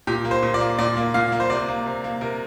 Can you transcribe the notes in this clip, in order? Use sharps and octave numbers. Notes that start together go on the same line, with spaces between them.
A#2 G4
A#3
C5
A#2
D5
A#3
A#2 D5
A#3
A#2 F5
A#3
C5
C3 D5
A#3
C3
A#3
C3 A#4